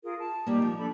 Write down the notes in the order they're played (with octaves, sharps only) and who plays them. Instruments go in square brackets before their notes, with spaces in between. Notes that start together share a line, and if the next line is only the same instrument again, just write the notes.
[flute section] F4 G#4 A#4
A5
[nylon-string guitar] G3 A#3 [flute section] D#4 G4
[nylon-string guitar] F3
[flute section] D4 A4 B5